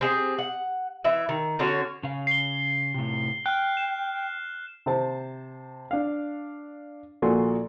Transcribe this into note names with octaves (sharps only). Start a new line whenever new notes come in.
C4 G4 G#4
F#5
E3 E5
D#3
D3 C#4 F#4 C#5
C#3 F5
C7 G7
A2 C3
G5 F6 F#6
E7
C3 C5 A5
D4 F5
A#1 A#2 F#4 A4 G#5 C6